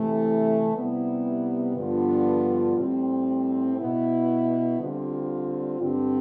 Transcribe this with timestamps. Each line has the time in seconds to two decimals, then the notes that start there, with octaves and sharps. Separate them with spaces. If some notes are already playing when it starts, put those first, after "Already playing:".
Already playing: C3 E3 A3 E4
0.74 C3 G3 B3 E4
1.76 G2 D3 F3 B3 F4
2.77 A2 G3 C4
3.77 B2 B3 E4
4.79 D3 G3 C4 F4
5.81 G2 D3 G3 C4